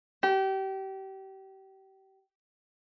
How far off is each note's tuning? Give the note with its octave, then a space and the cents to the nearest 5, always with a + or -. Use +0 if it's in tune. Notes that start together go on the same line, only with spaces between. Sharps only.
G4 -30